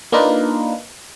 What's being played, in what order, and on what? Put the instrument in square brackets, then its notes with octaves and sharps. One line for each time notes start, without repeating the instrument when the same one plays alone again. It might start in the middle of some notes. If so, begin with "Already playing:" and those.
[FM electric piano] A#3 D4 D#4 F4 A#4 B4